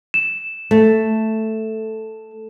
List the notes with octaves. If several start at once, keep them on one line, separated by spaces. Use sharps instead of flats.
E7
A3